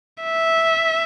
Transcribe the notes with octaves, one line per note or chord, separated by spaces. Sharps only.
E5